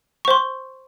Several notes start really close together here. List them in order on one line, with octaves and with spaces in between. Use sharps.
C#6 C5 C6